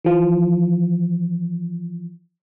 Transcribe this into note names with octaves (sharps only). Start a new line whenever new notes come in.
E3 F3